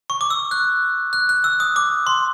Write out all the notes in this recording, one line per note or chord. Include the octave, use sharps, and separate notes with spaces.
C#6
D6
E6
F#6
F#6
F#6
E6
D#6
D6
C6